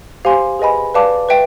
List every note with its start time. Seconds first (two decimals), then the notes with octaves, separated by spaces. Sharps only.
0.25 G4 C5 F5 G#5 C6
0.59 G#4 B4 D#5 G#5 B5
0.94 B4 D5 F5 A5 D6
1.29 B4 E5 G5